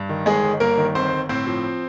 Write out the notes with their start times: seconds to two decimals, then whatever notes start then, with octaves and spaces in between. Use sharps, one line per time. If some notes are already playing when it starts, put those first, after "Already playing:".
Already playing: G2
0.09 D#3
0.26 G1 G#3 G#4
0.43 G1
0.60 G2 A#3 A#4
0.78 D#3
0.95 G1 C4 C5
1.12 G1
1.29 A2 C4 C5
1.47 F3